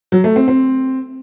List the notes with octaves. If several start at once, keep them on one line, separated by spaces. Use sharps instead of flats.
F#3
A3
C4
C4